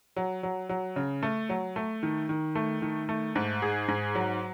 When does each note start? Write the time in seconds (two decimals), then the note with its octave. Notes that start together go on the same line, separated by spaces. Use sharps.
0.16 F#3
0.43 F#3
0.69 F#3
0.96 C#3
1.23 A3
1.49 F#3
1.76 A3
2.03 D#3
2.29 D#3
2.55 A3
2.82 D#3
3.09 A3
3.36 G#2
3.62 G#4
3.88 G#2
4.15 F#3